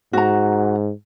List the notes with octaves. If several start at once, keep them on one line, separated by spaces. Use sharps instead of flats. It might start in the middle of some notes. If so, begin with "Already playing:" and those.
G#2 F#4 A#5